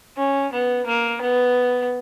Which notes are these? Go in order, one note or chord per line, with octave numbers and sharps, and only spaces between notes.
C#4
B3
A#3
B3